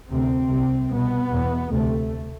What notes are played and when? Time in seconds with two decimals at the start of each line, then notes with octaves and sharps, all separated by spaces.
0.09 D2 C3 C4
0.50 C2 C3
0.89 C2 B2 B3
1.31 E2 B2
1.70 D2 C3 A3